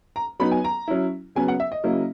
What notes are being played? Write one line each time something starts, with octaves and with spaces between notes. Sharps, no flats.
A#5
F#3 B3 D#4 B5
G#5
A#5
F#3 C#4 E4
C#3 F#3 B3 G#5
F#5
E5
D#5
C#3 F#3 A#3 E4